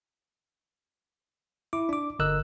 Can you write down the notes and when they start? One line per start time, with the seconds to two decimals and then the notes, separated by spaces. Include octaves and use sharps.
1.73 E4 D6
1.89 D4 D6
2.19 G1 D3 A#4 D#5 E6 F#6